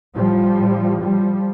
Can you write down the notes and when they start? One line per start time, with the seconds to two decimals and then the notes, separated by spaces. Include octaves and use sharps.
0.15 A2 F3 G3
0.58 A2
1.01 A2 F3 G3